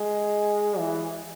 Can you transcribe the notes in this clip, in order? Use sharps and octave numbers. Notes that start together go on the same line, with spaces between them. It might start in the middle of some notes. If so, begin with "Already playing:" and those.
Already playing: G#3
E3